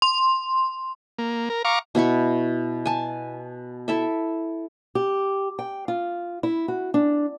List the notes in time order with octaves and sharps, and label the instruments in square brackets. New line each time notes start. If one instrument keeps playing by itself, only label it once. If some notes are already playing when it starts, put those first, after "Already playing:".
[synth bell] C6
[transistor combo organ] A#3
A#4
F5 A#5 C#6 D6
[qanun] B2 E4 B5 C#6
G#5 A5
E4 A4 E5
[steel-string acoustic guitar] G4
G5
F4
E4
F#4
D4